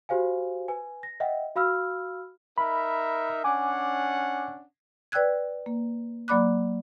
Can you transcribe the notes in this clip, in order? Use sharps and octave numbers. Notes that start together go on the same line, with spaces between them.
F#4 G4 C5 F5 G#5
B4 G#5
A#6
D#5 E5 F#5 G5
F#4 F5 B5 E6 F6
D#4 A#4 E5 B5
C#4 D4 F#5 G#5 D6
B4 D5 G5 E6 F#6 G#6
A#3
F#3 A#3 D5 B5 D6 F#6